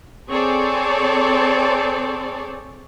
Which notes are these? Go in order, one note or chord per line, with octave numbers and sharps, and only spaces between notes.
C4 G#4 A4 C#5 D5